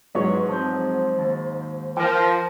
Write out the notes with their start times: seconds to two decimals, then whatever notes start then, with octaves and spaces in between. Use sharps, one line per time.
0.15 G#2 F#3 B4 C#5
0.49 F3 C4 C5
1.19 D#2
1.97 F3 A#4 G5